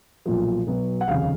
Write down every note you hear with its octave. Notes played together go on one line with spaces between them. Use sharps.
B1 A#2 F3
B1 B2 F#3 B3
F#5
F1 D#2 C#3 F5